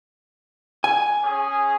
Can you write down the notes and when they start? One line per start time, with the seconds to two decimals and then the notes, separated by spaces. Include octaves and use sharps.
0.84 G#5
1.23 C#4 G#4